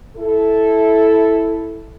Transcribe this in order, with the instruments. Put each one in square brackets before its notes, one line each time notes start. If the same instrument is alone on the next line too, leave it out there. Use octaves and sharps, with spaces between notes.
[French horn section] E4 A4